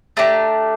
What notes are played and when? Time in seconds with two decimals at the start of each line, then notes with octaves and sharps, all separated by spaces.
0.17 A3 D4 G4 A#5